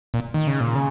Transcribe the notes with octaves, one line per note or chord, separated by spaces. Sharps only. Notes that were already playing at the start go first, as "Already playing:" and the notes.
A#2
D#3
C#3
A#2
C#3